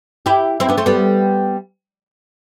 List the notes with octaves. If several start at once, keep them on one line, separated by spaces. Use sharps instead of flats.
E4 G4
C4 E4
B3 D4
A3 C4
G3 B3